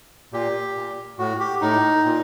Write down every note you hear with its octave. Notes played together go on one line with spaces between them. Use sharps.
A#2 G4
A#2
A2 F#4
G4
A2 D#4
A#2